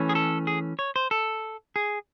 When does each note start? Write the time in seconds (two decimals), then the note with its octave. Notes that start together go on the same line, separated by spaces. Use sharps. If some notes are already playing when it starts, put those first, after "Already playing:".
Already playing: E3 A3 C#4
0.09 G#4
0.15 A4
0.47 G#4
0.79 C#5
0.96 C5
1.11 A4
1.76 G#4